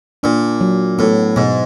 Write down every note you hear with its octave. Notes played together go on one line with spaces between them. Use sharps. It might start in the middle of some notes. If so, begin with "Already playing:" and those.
A#2 D4
F#3
A2 B3
G#2 B2